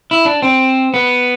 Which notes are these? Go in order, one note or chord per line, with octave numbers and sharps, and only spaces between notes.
E4
D4
C4
B3